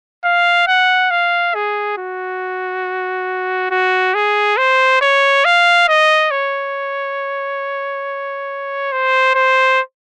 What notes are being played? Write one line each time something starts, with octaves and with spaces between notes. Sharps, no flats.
F5
F#5
F5
G#4
F#4
F#4
G#4
C5
C#5
F5
D#5
C#5
C5
C5